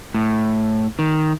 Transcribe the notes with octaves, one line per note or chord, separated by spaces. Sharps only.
A2
D#3